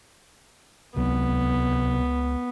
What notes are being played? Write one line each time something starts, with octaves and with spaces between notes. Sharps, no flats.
C#2 C3 F#3 B3 C4